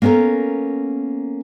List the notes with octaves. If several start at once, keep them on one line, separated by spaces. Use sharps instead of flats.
A#3 B3 C#4 A4 A#4